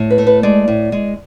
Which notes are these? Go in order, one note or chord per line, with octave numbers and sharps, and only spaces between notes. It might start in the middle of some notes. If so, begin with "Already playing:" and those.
Already playing: A2
B4
A3
B4
G#3 D5
A2
G#3